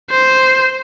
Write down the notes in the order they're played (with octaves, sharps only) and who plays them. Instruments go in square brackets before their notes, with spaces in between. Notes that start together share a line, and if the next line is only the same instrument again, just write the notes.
[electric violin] C5